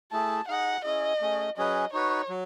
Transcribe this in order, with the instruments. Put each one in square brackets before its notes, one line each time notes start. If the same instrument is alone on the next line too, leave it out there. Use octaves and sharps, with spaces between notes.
[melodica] A3 E4 G#4 [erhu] A5
[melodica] D#4 G#4 D#5 [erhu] F#5
[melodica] C#4 E4 G#4 [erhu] D#5
[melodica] A3 C#4 G#4
[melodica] F#3 C#4 G#4 B4 [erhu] D#5
[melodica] D#4 F#4 B4 [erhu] C#5
[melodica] F#3